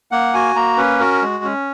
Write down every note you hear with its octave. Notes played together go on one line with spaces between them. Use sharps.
A#3 F#5
F#4 G#5
A#3 A#5
C#4 B4
F#4 A#4
G#3
C#4